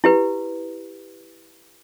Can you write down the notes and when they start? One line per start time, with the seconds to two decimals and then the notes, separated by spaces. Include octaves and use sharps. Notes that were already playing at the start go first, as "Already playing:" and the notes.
0.04 E4 G4 B4